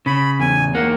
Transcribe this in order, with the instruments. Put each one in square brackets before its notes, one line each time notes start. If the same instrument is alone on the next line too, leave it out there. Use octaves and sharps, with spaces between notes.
[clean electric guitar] C#3 [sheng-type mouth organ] B5
[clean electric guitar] E2 [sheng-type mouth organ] G#5
[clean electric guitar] A#3 [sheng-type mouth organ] F#5